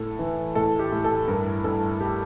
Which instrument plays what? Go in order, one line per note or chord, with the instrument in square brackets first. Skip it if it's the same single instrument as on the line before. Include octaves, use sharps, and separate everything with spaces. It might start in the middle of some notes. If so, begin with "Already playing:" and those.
Already playing: [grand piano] A2 A4
E3
A2 A4
G4
A2
A4
G2 A#4
G2 A4
G4